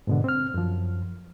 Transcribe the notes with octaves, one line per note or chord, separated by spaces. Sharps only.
G#2 B2 D3
C4 F6
F#2 F3